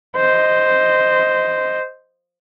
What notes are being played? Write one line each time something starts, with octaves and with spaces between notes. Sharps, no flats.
C5 D#5